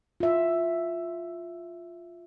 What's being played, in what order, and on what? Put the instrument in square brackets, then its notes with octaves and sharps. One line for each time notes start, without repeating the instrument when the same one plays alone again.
[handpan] F4 E5